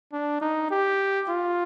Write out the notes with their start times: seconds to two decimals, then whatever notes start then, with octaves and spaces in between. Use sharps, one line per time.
0.13 D4
0.41 D#4
0.71 G4
1.29 F4